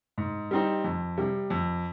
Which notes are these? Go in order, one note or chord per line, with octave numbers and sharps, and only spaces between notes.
G#2
G3 C4 D#4
F2
C3 G3
F2